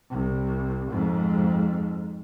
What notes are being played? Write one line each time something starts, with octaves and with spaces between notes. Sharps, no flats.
C2
F2 G#2